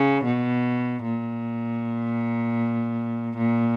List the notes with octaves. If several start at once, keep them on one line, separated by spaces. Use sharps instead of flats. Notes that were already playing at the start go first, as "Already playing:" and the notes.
Already playing: C#3
B2
A#2
A#2